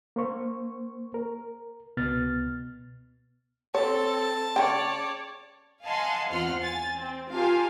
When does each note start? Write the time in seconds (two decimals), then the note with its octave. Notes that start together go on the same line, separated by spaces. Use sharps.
0.16 A#3 C5 C#6
1.14 A#4
1.97 C#2 B2 B3 F6 A6
3.75 C4 A4 C#5 A5
4.56 C#3 C#5 D5 G5
5.85 D#5 F5 F#5 G#5 A5 C6
6.30 E2 C4 F4 F#5 C6 F6
6.60 G#5 A6
6.97 C4
7.33 F4 G4 A#4 F5 G#5 A5